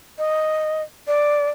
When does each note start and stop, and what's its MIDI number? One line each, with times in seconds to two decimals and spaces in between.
0.18 0.82 75
1.07 1.50 74